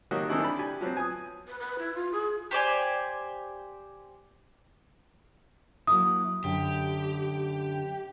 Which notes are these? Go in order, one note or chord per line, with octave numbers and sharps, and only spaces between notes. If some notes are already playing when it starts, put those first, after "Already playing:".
A2 D#3 F#3 A#3 F#4 G4
D#3 E3 A3 C4 D4 E4
D4 D5 B5
G4 G#5
F3 F#3 B3 C4
G#5 D#6
B4
B4
E4
F4
G#4
G4 C5 D5 G#5
F#3 A#3 E4 D#6
F#2 D3 G4